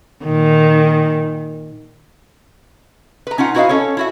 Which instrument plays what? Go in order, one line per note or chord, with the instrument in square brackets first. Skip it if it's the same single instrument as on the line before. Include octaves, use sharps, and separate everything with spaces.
[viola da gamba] A#2 D#3
[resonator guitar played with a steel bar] B4 A#5
C#4 D#4 F4 F#5
E4 F#4 B4 C#5 D#5 F5
C#4 A4 C#5
E4 F#4 E5